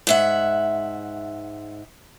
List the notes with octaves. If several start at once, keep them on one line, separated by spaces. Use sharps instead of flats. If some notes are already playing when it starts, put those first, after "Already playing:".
G#2 E5 F#5